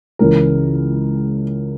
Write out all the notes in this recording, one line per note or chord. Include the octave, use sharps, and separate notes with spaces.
C#2 C#3 E3 A#4